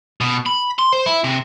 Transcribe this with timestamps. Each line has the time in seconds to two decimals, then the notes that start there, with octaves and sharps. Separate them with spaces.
0.21 B2
0.46 B5
0.79 C6
0.93 C5
1.06 E4
1.24 C3